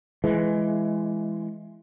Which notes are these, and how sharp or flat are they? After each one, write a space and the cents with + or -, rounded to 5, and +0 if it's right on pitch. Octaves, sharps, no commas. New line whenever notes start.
E3 +20 G#3 +15